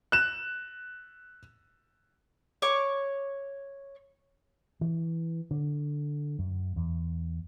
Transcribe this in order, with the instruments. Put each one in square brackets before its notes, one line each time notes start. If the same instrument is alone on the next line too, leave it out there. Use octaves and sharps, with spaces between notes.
[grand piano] F#6 E7
[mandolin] C#5 C#6 D6
[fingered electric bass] E3
D3
F#2
E2